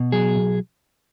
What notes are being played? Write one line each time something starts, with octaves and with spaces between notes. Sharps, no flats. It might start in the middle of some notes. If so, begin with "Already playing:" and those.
Already playing: B2
F#3 G#4
B1